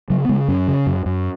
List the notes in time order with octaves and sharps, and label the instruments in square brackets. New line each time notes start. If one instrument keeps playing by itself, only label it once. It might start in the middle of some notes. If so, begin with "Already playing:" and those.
[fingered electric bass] C#3 F#3
B3
C#3 G#3
F#2 C#4
C#3
F#2
F#2